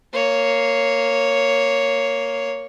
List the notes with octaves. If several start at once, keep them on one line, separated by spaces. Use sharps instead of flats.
A#3 C#5